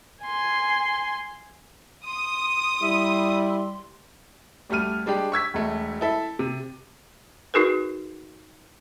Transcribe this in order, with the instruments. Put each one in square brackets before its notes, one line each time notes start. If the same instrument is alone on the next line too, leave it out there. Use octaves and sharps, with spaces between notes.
[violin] G#5 C6
[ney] C6 [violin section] D#6
[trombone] G3 [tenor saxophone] E4
[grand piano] D2 G3 A3 F6 D#7
G3 G#3 D4 G4
C#6 E6 G#6 B6
E1 A3
E4 A4 E5
C3
[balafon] D#4 F#4 G#4 A#4 B4